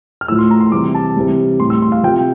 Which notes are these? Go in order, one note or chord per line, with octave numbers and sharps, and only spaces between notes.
F6
A2 F3 E6
C6
A#5
C6
C3 E3 G3 D6
A5
C3 E3 G3
A2 G3 C6
E6
C6
F5
C3 F3 G5